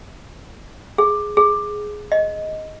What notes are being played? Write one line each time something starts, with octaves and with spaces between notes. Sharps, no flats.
G#4
G#4
D#5